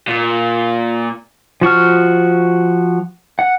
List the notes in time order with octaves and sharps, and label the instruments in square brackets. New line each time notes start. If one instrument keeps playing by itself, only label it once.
[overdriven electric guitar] A#2
[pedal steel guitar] F3 F#4 C#6 F6
F#5